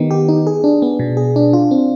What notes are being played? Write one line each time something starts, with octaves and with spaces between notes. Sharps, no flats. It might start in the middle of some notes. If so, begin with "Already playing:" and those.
Already playing: D#3 B3 D#4 G4
G4
D#4
G#4
D4
B3
B2
G#4
D4
F4
C4